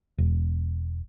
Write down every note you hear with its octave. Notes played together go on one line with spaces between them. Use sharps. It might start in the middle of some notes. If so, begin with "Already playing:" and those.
E1